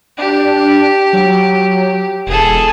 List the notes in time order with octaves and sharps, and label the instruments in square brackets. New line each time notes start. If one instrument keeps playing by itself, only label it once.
[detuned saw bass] D4 [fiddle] G4
[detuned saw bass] F#3
[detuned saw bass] E1 [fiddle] G#4 A4